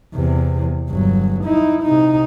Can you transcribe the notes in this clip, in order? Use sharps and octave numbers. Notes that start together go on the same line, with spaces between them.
E2 C3
G1 F#3
D#4 E4
C3 D#4